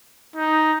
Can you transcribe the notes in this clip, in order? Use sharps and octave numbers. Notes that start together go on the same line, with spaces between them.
D#4